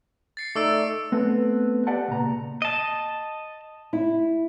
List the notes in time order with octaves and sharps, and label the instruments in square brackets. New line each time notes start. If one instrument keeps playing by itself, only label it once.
[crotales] A6 C7 C#7
[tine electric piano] A3 D#4 D5 [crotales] D6 E6 D7
[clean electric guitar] A3 B3 C4
G4 B4 D5 F#5 G5 A5
C#2 A#2 A#5
[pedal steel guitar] D#5 A5
[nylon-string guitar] E4